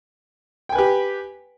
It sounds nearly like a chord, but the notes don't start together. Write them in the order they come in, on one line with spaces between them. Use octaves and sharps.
G5 G#5 B4 G4